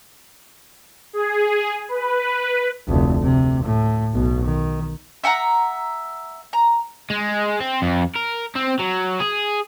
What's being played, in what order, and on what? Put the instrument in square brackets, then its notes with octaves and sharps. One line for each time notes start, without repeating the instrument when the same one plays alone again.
[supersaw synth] G#4
B4
[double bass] F1 D2
C3
A2
B1 B2
D#3
[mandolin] E5 F#5 G5 A#5
A#5
[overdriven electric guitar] G#3
C4
F2
A#4
C4
F#3
G#4